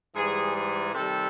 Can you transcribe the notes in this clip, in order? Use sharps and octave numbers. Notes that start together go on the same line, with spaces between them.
G#2 E3 G3 G#4
G#4
C3 D#3 G3 A4